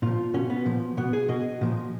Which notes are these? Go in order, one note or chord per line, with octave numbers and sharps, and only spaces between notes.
A#2 F3 F4
B2 C#4
B3
A#2 F3
B2 B3
G#4
B2 D#5
A#2 F3